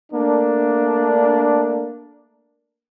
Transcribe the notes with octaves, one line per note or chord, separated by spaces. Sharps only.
A3 A#3 D4